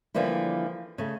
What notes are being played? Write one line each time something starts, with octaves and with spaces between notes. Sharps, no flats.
D3 E3 F3 G3 A#3 E4
C#3 A3